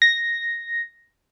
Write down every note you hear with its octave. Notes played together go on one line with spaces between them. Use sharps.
A#6